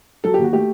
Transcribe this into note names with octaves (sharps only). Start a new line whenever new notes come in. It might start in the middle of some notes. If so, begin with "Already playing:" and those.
F#3 A4
D#2 G4
F#4
A3 G4